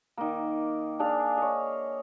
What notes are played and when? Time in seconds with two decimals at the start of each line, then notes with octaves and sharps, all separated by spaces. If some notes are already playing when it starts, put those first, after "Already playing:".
0.17 D#3 A#3
0.99 D4 G#4 F5
1.37 C#5 D#5